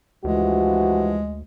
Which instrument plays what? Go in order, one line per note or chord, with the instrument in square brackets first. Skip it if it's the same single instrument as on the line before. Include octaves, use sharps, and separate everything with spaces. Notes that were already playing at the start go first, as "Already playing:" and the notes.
[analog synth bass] D2 [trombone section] G2 E3 F3 [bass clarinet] G#3 [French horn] F#4